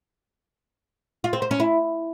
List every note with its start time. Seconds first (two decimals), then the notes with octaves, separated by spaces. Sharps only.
1.24 F4
1.33 C4
1.42 C5
1.51 C#4
1.60 E4